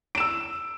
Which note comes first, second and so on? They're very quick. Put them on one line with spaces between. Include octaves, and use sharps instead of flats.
D7 E7 E6